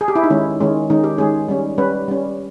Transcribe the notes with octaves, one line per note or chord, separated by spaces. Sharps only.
G#4
G4
E4
D#4
D#3 G#3 C#4
D#3 G#3 C#4
D#3 G#3 C#4 D#4
G4
D#3 G#3 C#4 G#4
G3 C#4
G3 C#4 B4
G3 C#4